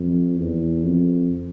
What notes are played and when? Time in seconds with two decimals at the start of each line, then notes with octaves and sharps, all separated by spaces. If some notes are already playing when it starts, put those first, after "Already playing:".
Already playing: F2
0.39 E2
0.83 F2